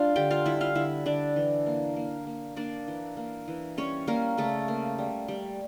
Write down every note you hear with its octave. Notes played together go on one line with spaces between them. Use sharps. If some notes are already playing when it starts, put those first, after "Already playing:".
Already playing: G3 D4 F4 F5
D3 G4 G5
F4 F5
G3 E4 E5
F4 F5
D3 E4 E5
D3 D4 D5
E3
A#3
A#3
A#3
A#3 D4 D5
E3
A#3
E3
G3 C#4 C#5
G3 A#3 A#4
C#3 A3 A4
A#3
G3
G3